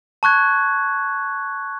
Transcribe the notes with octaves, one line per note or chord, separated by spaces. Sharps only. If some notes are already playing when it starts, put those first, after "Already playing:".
A5 C#6 F#6 G#6